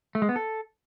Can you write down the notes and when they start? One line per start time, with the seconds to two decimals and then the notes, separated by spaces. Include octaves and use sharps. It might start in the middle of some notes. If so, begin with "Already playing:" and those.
0.15 A3
0.22 G#3
0.29 B3
0.36 A4